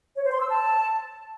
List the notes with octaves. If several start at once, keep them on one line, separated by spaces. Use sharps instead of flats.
C#5
C5
C6
E6
A5